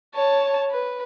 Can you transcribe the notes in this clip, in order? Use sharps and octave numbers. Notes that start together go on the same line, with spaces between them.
C#5 A5
B4